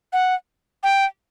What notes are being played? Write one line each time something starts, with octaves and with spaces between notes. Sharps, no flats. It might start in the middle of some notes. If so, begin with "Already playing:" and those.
F#5
G5